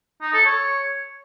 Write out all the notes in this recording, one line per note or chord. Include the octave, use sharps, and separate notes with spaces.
D#4
A4
C#5